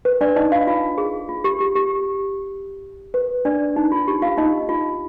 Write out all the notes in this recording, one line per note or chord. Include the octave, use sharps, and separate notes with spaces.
B4
D4 D5
D#4 D#5
F4 F5
F4 F5
G#4
F4
G4
G4
G4
B4
D4 D5
D#4
F4
G4
F4 F5
D#4 D#5
F4